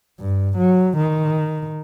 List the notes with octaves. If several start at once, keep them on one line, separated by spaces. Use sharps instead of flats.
G2
F#3
D#3